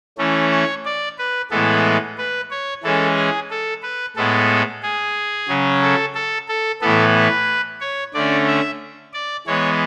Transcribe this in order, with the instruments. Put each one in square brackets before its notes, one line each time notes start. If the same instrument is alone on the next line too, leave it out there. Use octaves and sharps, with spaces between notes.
[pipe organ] E3 A3 C#4
C#5
D5
B4
A2 E3 G#3 B3 A4
B4
C#5
E3 G#3 C#4 A4
G#4
A4
B4
A2 G#3 B3 A4
G#4
C#3 F#3 C#4
A4
A4
A4
A2 E3 B3 A4
B4
C#5
D3 A3 C#4 D5
E5
D5
E3 G#3 B3 C#5